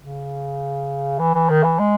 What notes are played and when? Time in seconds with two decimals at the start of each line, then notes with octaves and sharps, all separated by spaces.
0.02 C#3
1.19 E3
1.35 E3
1.50 D#3
1.63 E3
1.79 G#3